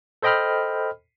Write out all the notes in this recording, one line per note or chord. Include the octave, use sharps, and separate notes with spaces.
A4 C5 D#5 G5 B5 F6